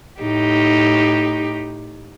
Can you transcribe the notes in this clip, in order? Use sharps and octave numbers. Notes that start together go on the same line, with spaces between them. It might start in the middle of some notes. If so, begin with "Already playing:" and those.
A2 D#4 G4